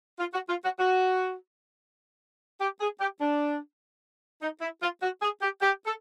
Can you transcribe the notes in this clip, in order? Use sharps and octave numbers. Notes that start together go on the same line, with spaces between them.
F4
F#4
F4
F#4
F#4
G4
G#4
G4
D4
D#4
E4
F4
F#4
G#4
G4
G4
A4